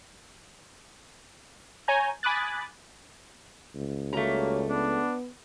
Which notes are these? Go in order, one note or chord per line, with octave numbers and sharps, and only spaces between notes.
C#5 G#5 A#5 G6
G#5 B5 D6 D#6 F#6 A6
C#2
G3 A3 A#3 F#4 C#5 A#5
B3 D4